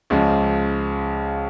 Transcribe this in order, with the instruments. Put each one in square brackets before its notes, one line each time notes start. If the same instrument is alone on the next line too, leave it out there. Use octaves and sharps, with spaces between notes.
[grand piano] C#2 C#3 F3 G#3